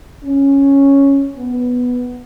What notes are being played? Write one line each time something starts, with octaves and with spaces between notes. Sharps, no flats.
C#4
B3